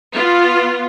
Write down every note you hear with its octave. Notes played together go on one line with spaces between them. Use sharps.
B3 F4